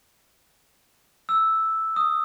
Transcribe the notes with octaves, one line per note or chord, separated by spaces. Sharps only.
E6
D#6